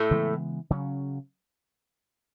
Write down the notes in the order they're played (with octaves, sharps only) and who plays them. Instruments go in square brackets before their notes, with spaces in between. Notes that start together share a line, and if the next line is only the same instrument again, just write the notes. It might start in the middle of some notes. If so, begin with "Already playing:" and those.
Already playing: [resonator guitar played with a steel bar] A2 A3
[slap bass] C#3 E3 G#3 B3
C#3 F#3 C#4